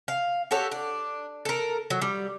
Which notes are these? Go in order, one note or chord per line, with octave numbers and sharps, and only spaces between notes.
F5
F#4 G4 A4 C#5
D4
A4 A#4
F#3
G3